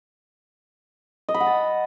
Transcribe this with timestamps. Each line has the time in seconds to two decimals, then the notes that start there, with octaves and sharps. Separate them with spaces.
1.28 D#5
1.34 B5
1.40 F#5
1.46 A5